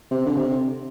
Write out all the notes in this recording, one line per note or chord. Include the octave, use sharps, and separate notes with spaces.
C3
D3
C3